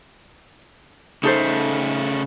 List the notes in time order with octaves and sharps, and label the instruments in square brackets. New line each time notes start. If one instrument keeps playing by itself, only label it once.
[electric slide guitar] C#3 A3 [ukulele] D#4 A4 C5